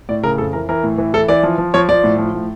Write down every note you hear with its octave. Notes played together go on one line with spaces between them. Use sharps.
A2 D5
C#3 A#4
F2 A4
E3 A#4
E3 A#4
A2
E3
E3 A4
E3 D5
F3
F3
F3 C#5
F3 D5
A2
F3
A2